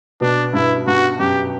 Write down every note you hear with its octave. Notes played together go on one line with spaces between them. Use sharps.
B2 D4
G2 E4
G2 F#4
F#2 G4